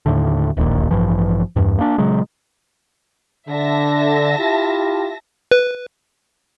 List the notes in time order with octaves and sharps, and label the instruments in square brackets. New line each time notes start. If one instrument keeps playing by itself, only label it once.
[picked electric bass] D#2 A2 D3
D1 A#1 D#2 A#2
A1 G2 E3 F3
E2 G2
A#3 D4
A#2 C#3 F#3 G#3
[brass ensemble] D3 [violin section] E5 A5 A#6
[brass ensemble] E4 F4 G4
[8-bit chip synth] B4